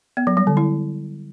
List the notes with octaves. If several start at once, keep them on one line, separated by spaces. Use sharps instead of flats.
B3
F#3
G3
D3
E4